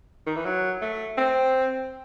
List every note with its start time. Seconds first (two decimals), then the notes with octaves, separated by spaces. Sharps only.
0.26 D#3
0.36 E3
0.45 F#3
0.82 A3
1.18 C4